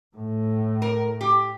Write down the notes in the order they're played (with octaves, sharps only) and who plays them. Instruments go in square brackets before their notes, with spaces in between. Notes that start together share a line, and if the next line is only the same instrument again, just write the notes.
[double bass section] A2
[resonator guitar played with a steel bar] A#4
G4